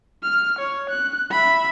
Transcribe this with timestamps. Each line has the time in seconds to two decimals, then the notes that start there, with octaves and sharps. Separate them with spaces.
0.23 F6
0.59 C#5
0.90 F#6
1.31 E5 B5